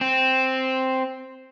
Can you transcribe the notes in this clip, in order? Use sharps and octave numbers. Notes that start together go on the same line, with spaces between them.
C4